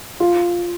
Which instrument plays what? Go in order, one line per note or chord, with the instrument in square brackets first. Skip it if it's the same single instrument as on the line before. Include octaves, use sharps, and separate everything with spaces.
[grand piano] F4